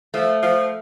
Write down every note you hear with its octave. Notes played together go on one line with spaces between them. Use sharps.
F3 A3
F3